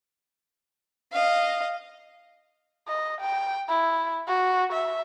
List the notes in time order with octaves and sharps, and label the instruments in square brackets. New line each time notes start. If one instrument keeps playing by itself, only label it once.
[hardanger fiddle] D#5 F5
[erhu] D#5
G5
E4
F#4
E5